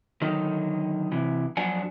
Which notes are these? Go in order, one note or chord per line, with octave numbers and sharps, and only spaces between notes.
D3 D#3 F#3 D#4
C3 E3
F2 F#3 D4 F#5 G#5